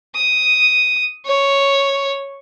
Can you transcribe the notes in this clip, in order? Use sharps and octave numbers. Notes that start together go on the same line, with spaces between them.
D#6
C#5